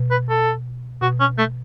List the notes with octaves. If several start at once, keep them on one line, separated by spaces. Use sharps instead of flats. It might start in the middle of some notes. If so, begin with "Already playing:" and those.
Already playing: B2
B4
A4
B2 F#4
C#4
A3